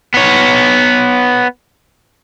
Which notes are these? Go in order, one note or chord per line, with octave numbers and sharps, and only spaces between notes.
B3 C#5